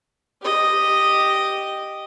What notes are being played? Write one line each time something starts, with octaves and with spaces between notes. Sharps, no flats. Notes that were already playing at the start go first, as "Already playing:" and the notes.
G4 D#5